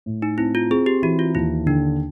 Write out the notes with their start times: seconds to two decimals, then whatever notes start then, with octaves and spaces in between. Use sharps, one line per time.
0.06 A2
0.22 D#4
0.38 C4 E4
0.55 F4
0.70 C4 G#4
0.86 G4
1.02 E3 F#4
1.19 F4
1.35 D#2 E4
1.66 D3 D4